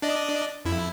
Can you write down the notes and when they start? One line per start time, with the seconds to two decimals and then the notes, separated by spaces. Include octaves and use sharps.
0.02 D4 D5 D#5
0.65 F2 E4